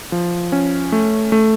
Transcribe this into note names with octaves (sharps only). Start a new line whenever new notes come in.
F3
C#4
A3
A3